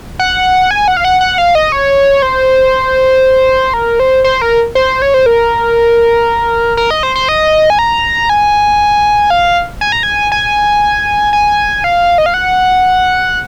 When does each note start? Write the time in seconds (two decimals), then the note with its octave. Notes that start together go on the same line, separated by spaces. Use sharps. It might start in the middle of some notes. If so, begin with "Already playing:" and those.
0.19 F#5
0.71 G#5
0.88 F#5
0.97 F5
1.05 F#5
1.21 F#5
1.38 F5
1.55 D#5
1.72 C#5
2.22 C5
3.74 A#4
4.00 C5
4.24 C5
4.42 A#4
4.75 C5
5.02 C#5
5.14 C5
5.26 A#4
6.77 A#4
6.91 D#5
7.03 C5
7.16 C5
7.29 D#5
7.70 G#5
7.79 A#5
8.30 G#5
9.30 F5
9.81 G#5
9.92 A#5
10.03 G#5
10.32 G#5
11.33 G#5
11.84 F5
12.18 D#5
12.26 F5
12.34 F#5